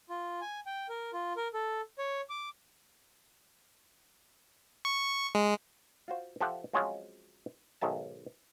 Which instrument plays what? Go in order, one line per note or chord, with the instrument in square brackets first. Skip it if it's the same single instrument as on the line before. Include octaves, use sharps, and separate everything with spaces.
[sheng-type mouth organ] F4
G#5
G5
A#4
F4
A#4
A4
C#5
D6
[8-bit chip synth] C#6
G#3
[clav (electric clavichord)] F4 F#4 C5
F3 G4 A4 E5 F#5
F3 F#3 G#3 C4 C#4 F4
B1 G#2 D#3 E5 A5